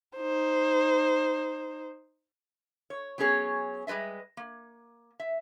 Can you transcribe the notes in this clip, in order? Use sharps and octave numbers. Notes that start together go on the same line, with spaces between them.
D#4 C5
C#5
F#3 B3 C#4 G#4 C#5
G3 G#3 B4 D#5 E5
A#3
E5